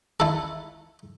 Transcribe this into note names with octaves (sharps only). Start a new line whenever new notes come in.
E4 A4